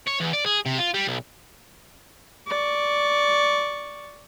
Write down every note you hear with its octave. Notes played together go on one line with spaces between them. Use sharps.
C#5
E2
D5
G#4
C3
F4
G3
B1
D5 C#6